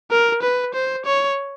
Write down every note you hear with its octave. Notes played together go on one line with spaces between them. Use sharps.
A#4
B4
C5
C#5